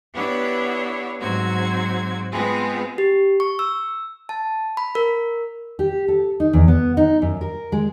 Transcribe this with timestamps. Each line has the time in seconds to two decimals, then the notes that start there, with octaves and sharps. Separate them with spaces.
0.13 B3 D4 E4 G4 C#5
1.19 G#2 F#3 C4 F#4 G#6
2.30 G#3 B3 C4 F4 G#4 B4
2.98 G4
3.40 C#6
3.59 E6
4.29 A5
4.77 B5
4.95 A#4
5.79 G4
6.08 A4
6.40 D#4
6.53 E2
6.68 B3
6.97 D#4
7.22 F#2
7.41 A#4
7.72 G#3